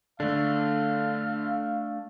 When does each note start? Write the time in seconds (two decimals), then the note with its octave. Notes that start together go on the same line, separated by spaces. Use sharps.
0.20 D3 A3 D4 F5